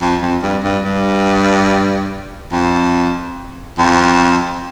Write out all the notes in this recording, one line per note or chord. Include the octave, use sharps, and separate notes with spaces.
F2
F2
G2
G2
G2
F2
F2